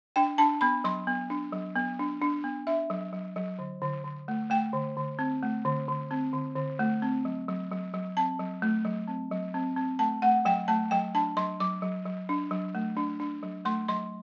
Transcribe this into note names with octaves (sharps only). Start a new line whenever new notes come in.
D4 G5
D4 A5
B3 B5
F#3 C6
B3
D4
F#3
B3
D4
D4
B3
D4 E5
F#3
F#3
F#3
D3
D3
D3
A3
A3 G5
D3
D3
C4
A3
D3
D3
C4
D3
D3
A3
C4
F#3
F#3
F#3
F#3
C4 A5
F#3
A3
F#3
C4
F#3
C4
C4
A3 A5
A3 F#5
F#3 G5
A3 A5
F#3 G5
D4 A5
F#3 C6
F#3 D6
F#3
F#3
D4
F#3
A3
D4
D4
F#3
A3 C6
F#3 C6